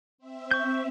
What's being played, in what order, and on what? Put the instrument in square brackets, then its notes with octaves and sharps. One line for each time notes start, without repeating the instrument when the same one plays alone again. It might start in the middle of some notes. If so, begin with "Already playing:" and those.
[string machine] C4 E5
[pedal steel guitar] C#6 G6